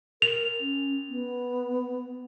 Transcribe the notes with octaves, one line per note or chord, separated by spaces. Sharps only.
A#4 F7
C#4
B3